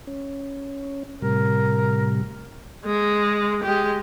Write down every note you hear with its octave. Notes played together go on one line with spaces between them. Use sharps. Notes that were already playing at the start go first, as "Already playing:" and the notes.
C#4
A2 C3 G3 A#4
G#3
G#3 G4